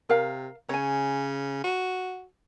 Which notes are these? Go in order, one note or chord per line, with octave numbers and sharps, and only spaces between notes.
C3 A#4 F5
C#3 C#5 G#5
F#4